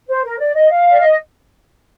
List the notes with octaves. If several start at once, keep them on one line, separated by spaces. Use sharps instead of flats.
C5
A#4
D5
D#5
F5
D5
D#5